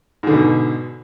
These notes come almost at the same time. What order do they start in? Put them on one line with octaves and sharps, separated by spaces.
G#2 D3 B2